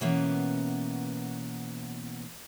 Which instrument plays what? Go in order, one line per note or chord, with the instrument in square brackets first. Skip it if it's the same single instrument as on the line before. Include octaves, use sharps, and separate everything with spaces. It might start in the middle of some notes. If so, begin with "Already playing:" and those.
[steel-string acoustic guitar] B2 E3 A#3 B3 C#4